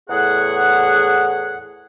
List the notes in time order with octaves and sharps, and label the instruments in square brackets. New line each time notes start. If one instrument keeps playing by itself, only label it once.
[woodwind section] E2 A2 G#4 F#5